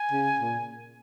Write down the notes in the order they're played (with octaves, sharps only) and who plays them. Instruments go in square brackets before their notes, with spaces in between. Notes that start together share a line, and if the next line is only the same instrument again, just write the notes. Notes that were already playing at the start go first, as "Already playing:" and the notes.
Already playing: [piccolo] G#5
[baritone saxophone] C#3
A#2